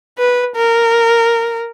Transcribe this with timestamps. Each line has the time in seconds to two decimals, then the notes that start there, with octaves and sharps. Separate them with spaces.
0.18 B4
0.55 A#4